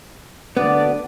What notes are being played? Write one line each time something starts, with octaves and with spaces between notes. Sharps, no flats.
D2 B3 D4 D5